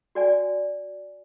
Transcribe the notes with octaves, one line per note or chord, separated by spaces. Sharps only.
F#4 D5 G#5